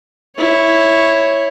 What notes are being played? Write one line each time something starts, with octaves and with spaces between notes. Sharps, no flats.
E4 C#5